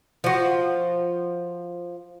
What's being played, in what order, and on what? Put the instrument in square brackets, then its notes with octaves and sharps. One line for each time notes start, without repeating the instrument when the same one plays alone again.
[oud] F3 F#4